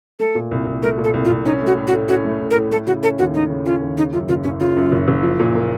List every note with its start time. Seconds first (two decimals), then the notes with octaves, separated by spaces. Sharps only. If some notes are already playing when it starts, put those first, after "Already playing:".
0.20 A3 A4
0.35 A#2
0.51 C2
0.66 C2
0.83 A3 A#4
0.98 A#2
1.04 A4
1.14 C2
1.25 F4
1.29 C2
1.45 C#4 D#4
1.61 A3
1.67 F#4
1.77 A2
1.87 F#4
1.93 A2
2.08 C#4 F#4
2.25 A3
2.41 A2
2.51 A#4
2.55 A2
2.71 A3 A4
2.87 C#3 F#4
3.02 C#4 A4
3.19 D#2 F#4
3.34 A3 D#4
3.50 C#3
3.66 C#4 F4
3.82 D#2
3.97 C#3 D#4
4.13 F#2 F4
4.29 F#1 F4
4.44 F#1 C#4
4.60 C#3 F4
4.77 F#2
4.92 F#1
5.08 F#1
5.23 F3
5.39 A#2
5.55 A#3